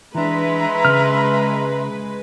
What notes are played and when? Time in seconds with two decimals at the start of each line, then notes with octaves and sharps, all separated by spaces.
0.15 E3 G#3 D4 B4 E5 A#5 C6
0.85 C#3 F6